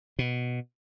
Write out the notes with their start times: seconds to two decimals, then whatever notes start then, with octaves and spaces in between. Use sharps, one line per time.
0.19 B2